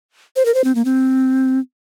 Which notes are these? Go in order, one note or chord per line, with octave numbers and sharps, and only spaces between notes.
C5
A#4
C5
C4
A#3
C4